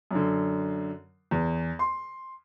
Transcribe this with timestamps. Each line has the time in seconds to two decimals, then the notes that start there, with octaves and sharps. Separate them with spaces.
0.11 F#2 D3
1.31 E2
1.79 C6